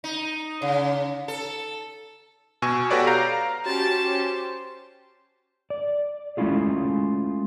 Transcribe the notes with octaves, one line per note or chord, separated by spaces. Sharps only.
D#4
C#3
A4
B2 G#5 C#6 E6
F#4 G4 A4 B4 C#5 D5
F5 A#5 G6 D7
C#4 F#4 G4 C5 C#5 A5 A6
D5
G#3 A3 C#4 E4 F4 G#4